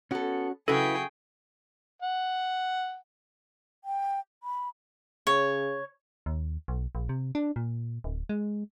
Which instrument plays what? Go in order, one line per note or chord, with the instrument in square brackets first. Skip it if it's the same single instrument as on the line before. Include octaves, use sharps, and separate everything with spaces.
[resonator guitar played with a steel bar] B3 A4 [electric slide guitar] C#4 F#4
[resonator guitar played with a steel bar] C#3 F#3 F#4 [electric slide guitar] E4 B4 [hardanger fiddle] G#4 G5 [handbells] A4
[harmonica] F#5
[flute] G5
B5
[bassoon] C#3 [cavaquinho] C#5
[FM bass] D#2
B1
A#1
C3
D4
A#2
D1
G#3